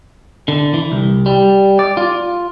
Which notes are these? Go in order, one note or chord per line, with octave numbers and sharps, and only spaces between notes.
D3
E3
C2
G3
D5
F4